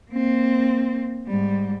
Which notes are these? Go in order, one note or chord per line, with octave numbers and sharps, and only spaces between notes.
A#3 C4
G#2 G3